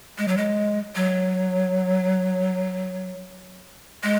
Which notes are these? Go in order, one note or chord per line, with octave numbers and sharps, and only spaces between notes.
G#3
F#3
G#3
F#3
G#3